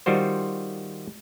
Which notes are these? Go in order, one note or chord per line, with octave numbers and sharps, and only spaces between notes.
D#3 G3 F4 F#4 C5